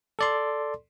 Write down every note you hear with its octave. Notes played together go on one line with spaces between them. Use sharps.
A4 D5 C6